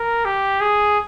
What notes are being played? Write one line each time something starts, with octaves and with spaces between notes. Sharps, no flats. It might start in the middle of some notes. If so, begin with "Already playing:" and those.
Already playing: A#4
G4
G#4